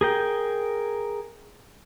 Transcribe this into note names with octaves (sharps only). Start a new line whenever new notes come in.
G#4 A#4 G5